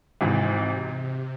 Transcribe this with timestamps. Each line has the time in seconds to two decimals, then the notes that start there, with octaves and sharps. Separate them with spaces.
0.21 G#1 G#2 C3 E3